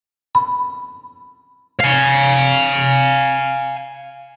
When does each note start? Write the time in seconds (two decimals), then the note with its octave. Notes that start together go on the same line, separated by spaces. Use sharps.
0.35 B5
1.80 F5 G#5